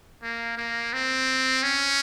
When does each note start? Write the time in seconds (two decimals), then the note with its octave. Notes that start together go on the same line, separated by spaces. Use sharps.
0.23 A#3
0.57 A#3
0.93 C4
1.63 C#4